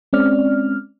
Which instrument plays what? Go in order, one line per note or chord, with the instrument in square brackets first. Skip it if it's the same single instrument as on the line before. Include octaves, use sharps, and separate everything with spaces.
[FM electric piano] G#3 C4 C#4 D5 F6